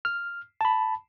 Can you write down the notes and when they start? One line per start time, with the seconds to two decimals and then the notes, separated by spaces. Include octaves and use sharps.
0.05 F6
0.61 A5 B5